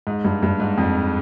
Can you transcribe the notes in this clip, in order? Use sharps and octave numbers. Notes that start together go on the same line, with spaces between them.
G#2
G2
G2
G#2
F2